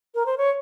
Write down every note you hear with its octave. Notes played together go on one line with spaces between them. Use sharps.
A#4
C5
C#5